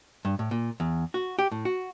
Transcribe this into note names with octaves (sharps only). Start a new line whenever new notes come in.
G2
A2
A#2
E2
F#4
G4
A2
F#4